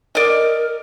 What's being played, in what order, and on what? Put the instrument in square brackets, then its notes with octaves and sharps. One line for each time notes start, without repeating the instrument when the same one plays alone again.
[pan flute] A#4 [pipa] D5 D#5